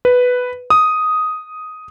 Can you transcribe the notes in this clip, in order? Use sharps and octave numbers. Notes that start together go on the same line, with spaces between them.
B4
D#6